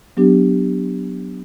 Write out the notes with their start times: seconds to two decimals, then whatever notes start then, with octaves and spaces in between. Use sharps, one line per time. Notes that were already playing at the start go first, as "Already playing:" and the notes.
0.17 F#3 B3 D4 G4